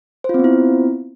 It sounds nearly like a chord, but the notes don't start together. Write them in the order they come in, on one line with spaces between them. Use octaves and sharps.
C5 F4 C4 B3 E4